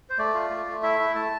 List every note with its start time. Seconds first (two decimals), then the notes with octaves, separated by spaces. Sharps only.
0.10 C5
0.18 A3 D5
0.35 F4
0.50 A3
0.67 A3
0.83 E4 E5
0.99 E4
1.15 A3 A5